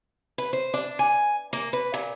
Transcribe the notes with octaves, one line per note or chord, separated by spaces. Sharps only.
B4
C5
D4
G#5
A#3
B4
A#2